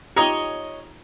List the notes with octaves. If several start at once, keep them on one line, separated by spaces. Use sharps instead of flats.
D#4 F4 G4 C#5 D#5 A#5